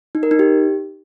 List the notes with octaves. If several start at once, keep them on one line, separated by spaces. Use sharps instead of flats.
D#4
A#4
D#4
G4